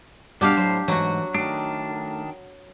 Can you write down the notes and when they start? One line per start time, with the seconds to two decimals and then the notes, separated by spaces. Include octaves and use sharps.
0.41 G2 B2 G3 D4 G4 F5 F#5 A5
0.57 A2 F#3 C5
0.88 G#2 E3 F#3 A3 F#4
1.34 D#3 A3 D4 A4